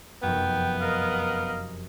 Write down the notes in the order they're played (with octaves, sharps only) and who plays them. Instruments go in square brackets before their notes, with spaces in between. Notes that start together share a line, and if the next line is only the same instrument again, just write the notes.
[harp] F1 F#2 [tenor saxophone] B3 [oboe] G5
[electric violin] A#4 D#5 [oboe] F5